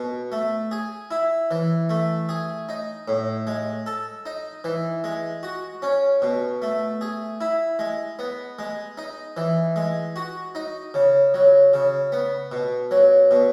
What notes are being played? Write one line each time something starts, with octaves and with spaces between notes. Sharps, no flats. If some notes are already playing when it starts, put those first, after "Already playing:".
Already playing: B2
A3
G#4
E4
E3
A3
G#4
D#4
A2
G#3
A4
D#4
E3
G#3
F#4
C#4
B2
A3
G#4
E4
G#3
B3
G#3
D#4
E3
G#3
F#4
D#4
C#3
F#3
C#3
B3
B2
F#3
B2